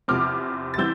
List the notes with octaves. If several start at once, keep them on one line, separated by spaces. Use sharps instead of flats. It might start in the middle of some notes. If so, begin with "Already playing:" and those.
E2 C3 F3 C4 D6 F6
A6
E3 G3 C4 E6 G6